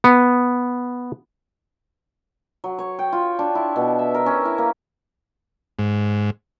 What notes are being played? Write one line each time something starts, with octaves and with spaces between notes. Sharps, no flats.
B3
F#3
C#5
G5
F4
D4
E4
B2
E5
A#4
C#4
E4
A#3
G#2